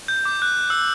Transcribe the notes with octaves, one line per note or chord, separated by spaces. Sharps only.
G6
D6
F#6
E6